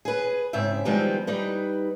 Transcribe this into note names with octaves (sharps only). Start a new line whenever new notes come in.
G#4 B4
G#2 C#3 C4 E5
D#3 F3 G3 G#3 B3 C4
G3 D#4 B4